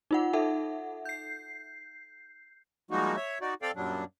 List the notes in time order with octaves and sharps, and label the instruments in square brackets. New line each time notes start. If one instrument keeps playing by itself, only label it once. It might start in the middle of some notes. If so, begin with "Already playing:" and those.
[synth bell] D#4 F4 F#5
D#4 A4 E5 F#5
G6 C7
[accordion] F3 G3 G#3 A#3 D#4 F#4
C#5 E5
D#4 F#4 D5
C4 A4 D5 F5 G5
F#2 A#2 F#3 G3 D4